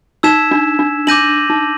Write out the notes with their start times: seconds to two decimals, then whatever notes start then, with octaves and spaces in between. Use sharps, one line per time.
0.23 D#4 E6 G#6 B6 E7
0.51 D4
0.79 D4
1.07 D4 D6 G6 A#6 D#7 F#7
1.50 D#4